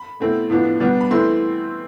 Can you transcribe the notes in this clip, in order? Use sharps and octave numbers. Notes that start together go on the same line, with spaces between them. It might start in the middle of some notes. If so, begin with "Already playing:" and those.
Already playing: B5
B2 A3 C4 E4
A2 F3 B3 D4
B2 G3 B3 D4
B5
E3 A3 C4 E4 C6